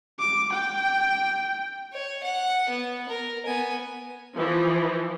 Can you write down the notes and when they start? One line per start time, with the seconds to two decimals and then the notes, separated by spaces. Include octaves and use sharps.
0.19 D6
0.53 G5
1.93 C#5
2.24 F#5
2.69 B3
3.09 A#4
3.46 B3 G#5
4.36 E3 F3